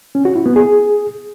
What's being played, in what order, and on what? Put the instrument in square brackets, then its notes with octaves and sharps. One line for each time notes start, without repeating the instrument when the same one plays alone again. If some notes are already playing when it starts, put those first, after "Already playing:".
[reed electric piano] C#4
F#4
E4
B3
G#4